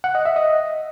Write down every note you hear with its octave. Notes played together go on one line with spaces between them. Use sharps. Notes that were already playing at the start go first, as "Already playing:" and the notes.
F#5
D#5
E5
D#5